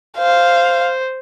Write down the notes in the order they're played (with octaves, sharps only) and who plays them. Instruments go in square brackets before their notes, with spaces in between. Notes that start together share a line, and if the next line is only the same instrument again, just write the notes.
[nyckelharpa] C5 [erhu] F5